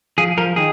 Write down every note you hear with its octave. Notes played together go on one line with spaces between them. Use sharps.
F3 G#4
F3 A#4
D#3 G#4